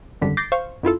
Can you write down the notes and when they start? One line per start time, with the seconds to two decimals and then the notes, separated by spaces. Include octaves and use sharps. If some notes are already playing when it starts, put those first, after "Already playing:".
0.22 G#1 F#2 D3 G3 B6
0.37 D6 G6 A6 A#6 C7
0.52 C5 F5 C#6
0.83 F#2 E4 F4 A4